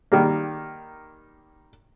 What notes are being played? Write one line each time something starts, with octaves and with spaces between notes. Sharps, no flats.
D#3 G3 A#3